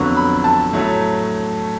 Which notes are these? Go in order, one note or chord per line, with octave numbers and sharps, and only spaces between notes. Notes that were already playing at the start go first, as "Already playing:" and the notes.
Already playing: F2 D3 F#3 B3 C#6
B5
A5
A2 F#3 A3